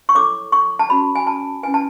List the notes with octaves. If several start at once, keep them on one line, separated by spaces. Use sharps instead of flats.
C#6
E4 A4 C#5 D6
C#6
A5
C#4 F#4 C#5 B5
G#5
A5
C#4 E4 B4 G#5
A5